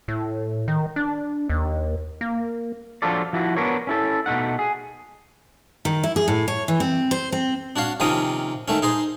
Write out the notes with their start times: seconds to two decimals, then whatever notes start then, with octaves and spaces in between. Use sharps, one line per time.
0.08 A2
0.68 D#3
0.96 D4
1.49 D#2
2.21 A#3
3.02 F3 F#3 D4 F4 A4 D5
3.33 F3 E4 F#4
3.56 B3 C4 D4 A#4 C#5
3.87 C#4 E4 A4
4.26 B2 A3 D#4 F#5
4.59 G#4
5.85 D#3
6.03 E4
6.16 G#4
6.28 A2
6.48 C#5
6.68 E3
6.80 C4
7.11 C5
7.32 C4
7.76 D4 F#4 C#5 F5
8.00 C3 D#3 F3 A#3 C#4 D#6
8.68 D#3 A3 C#4
8.82 D#4 G#4 C5